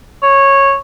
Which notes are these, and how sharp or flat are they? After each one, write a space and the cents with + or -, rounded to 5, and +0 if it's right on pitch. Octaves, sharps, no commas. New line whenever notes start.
C#5 -10